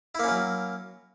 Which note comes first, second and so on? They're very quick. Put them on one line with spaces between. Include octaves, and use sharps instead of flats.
E4 A#3 C#4 F#3